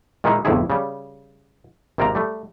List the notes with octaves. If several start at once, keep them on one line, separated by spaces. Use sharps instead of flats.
A#2 D#3 G#3 A#3 D#4 E4
G1 F2 A2 C3 E4 G#4
C#3 G3
G#1 C3 A#3 D5 G5 A#5
G3 A3